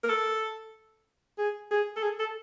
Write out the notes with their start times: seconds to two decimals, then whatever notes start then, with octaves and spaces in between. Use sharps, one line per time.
0.04 A#4
0.09 A4
1.38 G#4
1.71 G#4
1.96 A4
2.03 G#4
2.20 A4